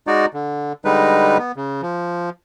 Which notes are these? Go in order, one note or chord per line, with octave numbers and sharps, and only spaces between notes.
G#3 D#4 F#4 D5
D3
D3 G3 G#3 D#4 B4
B3
C#3
F3